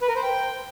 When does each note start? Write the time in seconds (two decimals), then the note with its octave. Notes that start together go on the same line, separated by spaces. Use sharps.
0.01 B4
0.08 A#4
0.16 C5
0.23 G5